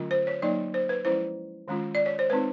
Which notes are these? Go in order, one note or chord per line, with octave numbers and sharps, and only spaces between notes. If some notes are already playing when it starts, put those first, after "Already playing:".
Already playing: D3 F#3 A3 C#4 F4
C5
C#5
F#3 A#3 D#4 D5
C5
B4
F3 G#3 C#4 E4 C5
D#3 G#3 C#4 F4
D5
C#5
C5
G#3 C4 D#4 B4